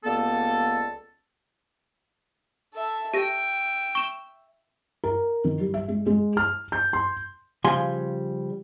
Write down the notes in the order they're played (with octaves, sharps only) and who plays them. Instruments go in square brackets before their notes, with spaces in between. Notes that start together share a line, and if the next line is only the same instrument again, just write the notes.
[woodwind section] C#2 G3 A#3 B3 A4
[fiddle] A4 E5
[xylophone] G4 A#6 [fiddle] E5 G5
[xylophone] C#6 E7
[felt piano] A#4
D#3
G3
E5
G#3
G#3
F6
G6
C6
[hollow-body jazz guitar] C#3 F3 G3 G#5 C6